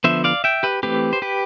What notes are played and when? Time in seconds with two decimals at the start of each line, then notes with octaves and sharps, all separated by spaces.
0.04 D3 F3 B3 C5 E5
0.24 D5 F5
0.44 E5 G5
0.63 G4 B4
0.83 E3 A3 C4 G4 B4
1.13 C5
1.22 G4 B4